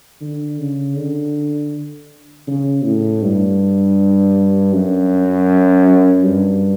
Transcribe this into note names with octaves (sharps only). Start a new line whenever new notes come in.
D3
C#3
D3
C#3
A2
G2
F#2
G2